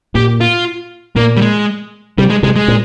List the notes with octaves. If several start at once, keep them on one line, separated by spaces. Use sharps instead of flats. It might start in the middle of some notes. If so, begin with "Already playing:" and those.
A#2 G4
F4
A#2 A#3
G3
G#3
C3 G3
G#3
C3 G#3
G#3
A#2